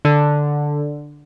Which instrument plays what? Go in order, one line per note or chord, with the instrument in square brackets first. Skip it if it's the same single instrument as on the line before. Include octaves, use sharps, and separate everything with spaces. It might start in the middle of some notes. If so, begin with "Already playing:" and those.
[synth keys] D3